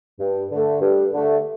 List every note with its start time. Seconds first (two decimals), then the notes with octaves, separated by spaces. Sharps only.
0.20 G2
0.51 D3 A3
0.81 G2
1.12 D3 A3